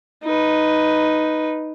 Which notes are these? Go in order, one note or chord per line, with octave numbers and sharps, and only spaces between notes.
D#4 B4